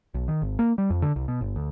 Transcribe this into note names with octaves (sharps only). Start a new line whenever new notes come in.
B1
D#3
G#1
A#3
G3
F2
D3
C2
B2
G1
D2